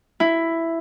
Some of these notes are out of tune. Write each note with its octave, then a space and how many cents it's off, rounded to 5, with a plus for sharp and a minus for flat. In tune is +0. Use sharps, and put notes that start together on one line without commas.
E4 +5